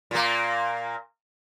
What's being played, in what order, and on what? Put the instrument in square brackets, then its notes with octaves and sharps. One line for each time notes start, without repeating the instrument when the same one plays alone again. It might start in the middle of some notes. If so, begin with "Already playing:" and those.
[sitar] A#2 A#3